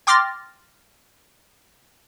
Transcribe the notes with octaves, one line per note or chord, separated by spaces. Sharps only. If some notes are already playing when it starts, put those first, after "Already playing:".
G5 C6 D6 F6 A6 A#6